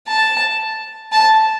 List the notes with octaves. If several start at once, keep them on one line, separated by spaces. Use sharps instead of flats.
A5
A5